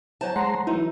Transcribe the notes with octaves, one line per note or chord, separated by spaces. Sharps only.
F#3 E4 C5 G#5 A5
G#3 F#5 A#5 C6
E3 F#3 A3 D#4 E4